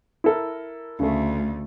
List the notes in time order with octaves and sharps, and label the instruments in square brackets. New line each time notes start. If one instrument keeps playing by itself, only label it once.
[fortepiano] E4 A4 A#4
[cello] D2 [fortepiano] C#3 A3